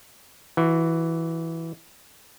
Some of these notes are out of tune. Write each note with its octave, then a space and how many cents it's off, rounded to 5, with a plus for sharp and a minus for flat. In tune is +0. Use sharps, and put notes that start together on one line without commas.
E3 +0 F#4 -20